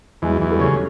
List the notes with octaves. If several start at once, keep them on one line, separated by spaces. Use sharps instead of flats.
E2 F#3 G#3
E2
G3 A3
C#3